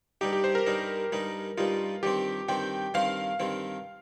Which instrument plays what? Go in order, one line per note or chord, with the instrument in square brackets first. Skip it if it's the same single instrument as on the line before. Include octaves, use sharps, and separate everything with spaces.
[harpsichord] G2 G3 D#4 [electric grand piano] G4
[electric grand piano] G4
C5
A#4
[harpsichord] G2 G3 D#4
G2 G3 D#4
[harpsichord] G2 G3 D#4 [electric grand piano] F4
[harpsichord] G2 D#3 C4 [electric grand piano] G4
[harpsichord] G2 D#3 C4 [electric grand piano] G5
[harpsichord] G2 D#3 C4 [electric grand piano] F5
[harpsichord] G2 D#3 C4